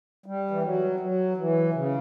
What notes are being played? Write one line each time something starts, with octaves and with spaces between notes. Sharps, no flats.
G3
E3
F#3
F#3
E3
C#3